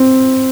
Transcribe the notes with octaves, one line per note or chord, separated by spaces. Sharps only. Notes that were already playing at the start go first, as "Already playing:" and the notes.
Already playing: C4